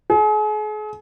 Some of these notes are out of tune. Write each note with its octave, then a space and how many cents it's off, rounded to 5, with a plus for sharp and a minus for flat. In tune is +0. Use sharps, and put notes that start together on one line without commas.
G#4 +40